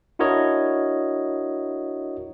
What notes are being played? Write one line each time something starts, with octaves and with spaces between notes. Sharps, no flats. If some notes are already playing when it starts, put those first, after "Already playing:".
D4 E4 F#4 A#4 C#5 D#5